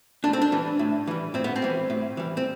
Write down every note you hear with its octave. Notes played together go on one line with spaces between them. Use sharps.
A2 D4
C4
D4
E3 G3
A2
E3 G3
A2 C4
B3
C4
E3 G3
A2
E3 G3
C4